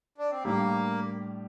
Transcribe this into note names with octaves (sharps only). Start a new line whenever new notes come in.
D4
C4
A2 G3 A#3 D4 G4